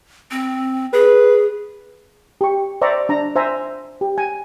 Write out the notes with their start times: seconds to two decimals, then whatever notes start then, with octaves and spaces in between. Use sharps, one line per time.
0.31 C4
0.93 G#4 B4
2.41 G4 C#6
2.82 C5 D5 E5 A#5 C#6
3.09 D4 A#5
3.36 C5 E5 G#5 A#5
4.01 G4
4.18 G#5